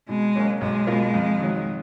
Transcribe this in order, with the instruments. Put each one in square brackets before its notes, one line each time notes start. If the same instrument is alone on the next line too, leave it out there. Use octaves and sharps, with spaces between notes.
[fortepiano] B2 [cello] G#3
[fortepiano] F#3 A#3 C#4
[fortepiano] B1 [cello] G#3
[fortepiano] B2 A#3 F4 A#4
F2
D#3 F#3